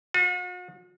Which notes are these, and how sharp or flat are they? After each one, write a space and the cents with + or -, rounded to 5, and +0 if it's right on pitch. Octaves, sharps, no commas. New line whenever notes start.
F#4 -45